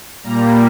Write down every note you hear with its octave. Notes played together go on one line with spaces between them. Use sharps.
A#2 G3 A#3 A#5